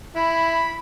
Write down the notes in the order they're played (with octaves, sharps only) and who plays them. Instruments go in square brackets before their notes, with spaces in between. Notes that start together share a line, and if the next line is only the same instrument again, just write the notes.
[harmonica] E4 [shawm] B5